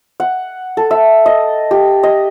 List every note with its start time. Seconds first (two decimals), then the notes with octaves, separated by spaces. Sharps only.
0.20 F#5
0.77 A4
0.91 E5
1.26 D#5
1.71 G4
2.03 D#5